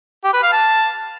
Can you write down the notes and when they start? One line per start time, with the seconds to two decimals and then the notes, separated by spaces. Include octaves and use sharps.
0.24 G4
0.33 B4
0.43 F5
0.52 A5